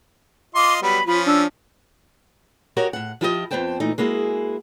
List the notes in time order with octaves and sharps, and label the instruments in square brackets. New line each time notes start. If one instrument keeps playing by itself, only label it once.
[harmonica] F4 D#5 C6 [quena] D6
[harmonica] F#3 G3 B3 [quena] B5
[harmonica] F3 C#4 [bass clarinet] F4 [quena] B5
[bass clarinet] D4 [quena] E6
[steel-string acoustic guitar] F#4 G4 A#4 C#5 D#5 F#5
A2 F#5
F3 E4 F4 G4 A#4 D#5
F2 A#3 B3 C5 G5 A5
A#2 E3 A3 D#4
G#3 A#3 E4 F#4 G#4